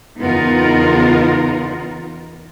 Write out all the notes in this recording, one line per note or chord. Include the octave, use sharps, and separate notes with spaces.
E2 C#3 B3 D#4 F4 A#4